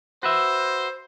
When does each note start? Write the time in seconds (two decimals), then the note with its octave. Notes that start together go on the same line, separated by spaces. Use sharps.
0.23 F#4 B4 C5 E5